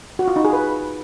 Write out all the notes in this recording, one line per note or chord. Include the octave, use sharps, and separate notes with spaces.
F#4
F4
D#4
G#4
B4